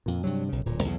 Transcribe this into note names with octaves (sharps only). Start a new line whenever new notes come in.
F2 A#2
G2 C3 F#3
B1 C#3
D1 A#2
B1 E2 C#3